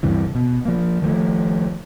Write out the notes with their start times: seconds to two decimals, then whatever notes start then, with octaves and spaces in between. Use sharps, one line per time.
0.03 D2 G2 C3 E3
0.35 B2
0.65 F3 A#3
1.02 D#3 F3 G#3 A3